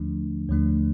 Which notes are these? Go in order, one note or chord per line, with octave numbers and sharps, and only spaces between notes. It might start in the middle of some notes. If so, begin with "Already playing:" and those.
Already playing: D#2 D3 F3 A3 D4
D#2 D3 F3 A3 D4